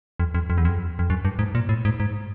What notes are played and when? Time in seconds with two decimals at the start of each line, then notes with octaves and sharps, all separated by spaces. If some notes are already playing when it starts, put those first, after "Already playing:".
0.20 F2
0.35 F2
0.50 F2
0.58 E2
0.65 F2
0.99 F2
1.10 F#2
1.25 G2
1.39 G#2
1.55 A#2
1.69 A2
1.85 G#2
2.00 G#2